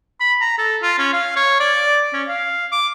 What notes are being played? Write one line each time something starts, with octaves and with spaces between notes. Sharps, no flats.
B5
A#5
A4
F4
C#4
F5
C#5
D5
C#4
F5
D6